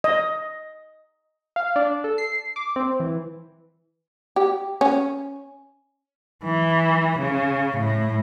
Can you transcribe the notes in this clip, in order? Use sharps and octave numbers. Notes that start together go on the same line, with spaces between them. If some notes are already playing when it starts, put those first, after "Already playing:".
D#5
F5
D4
A4
C7
D6
C4
E3
G4
C#4
E3
C#3
A2